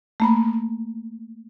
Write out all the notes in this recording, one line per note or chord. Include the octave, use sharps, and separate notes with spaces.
A3 A#3 B5